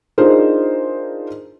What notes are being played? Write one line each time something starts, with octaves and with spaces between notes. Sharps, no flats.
D4 D#4 F4 G#4 A#4 C5